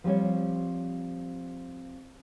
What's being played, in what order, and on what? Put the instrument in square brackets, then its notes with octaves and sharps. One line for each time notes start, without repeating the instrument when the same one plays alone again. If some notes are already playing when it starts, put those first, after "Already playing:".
[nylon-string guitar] F3 G3 C4 C#5